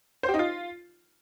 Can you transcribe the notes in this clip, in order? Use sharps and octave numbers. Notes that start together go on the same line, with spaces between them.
C5
G4
D#4
F4